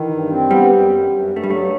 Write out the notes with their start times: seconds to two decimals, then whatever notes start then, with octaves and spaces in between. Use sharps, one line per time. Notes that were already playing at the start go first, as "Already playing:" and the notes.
Already playing: D#3 E3
0.10 G2
0.31 C4
0.50 G3 B3
0.70 F#2
0.90 F#2
1.10 F#2
1.29 G2
1.36 A3
1.44 G3
1.49 F#3 A3